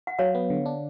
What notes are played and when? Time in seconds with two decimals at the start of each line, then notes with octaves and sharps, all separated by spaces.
0.07 F#5
0.19 F#3 C#5 F5
0.35 B3
0.50 D3
0.66 D4